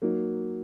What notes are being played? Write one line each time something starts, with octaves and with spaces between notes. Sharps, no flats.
F#3 A#3 D#4